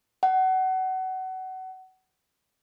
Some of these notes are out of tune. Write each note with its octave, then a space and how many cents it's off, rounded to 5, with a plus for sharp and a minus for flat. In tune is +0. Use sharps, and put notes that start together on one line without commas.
F#5 +25